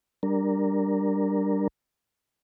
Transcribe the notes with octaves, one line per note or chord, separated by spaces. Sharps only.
G3 D4 A#4